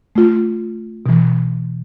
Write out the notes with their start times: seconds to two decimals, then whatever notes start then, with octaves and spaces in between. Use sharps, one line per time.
0.16 A3 F4
1.06 B2 E3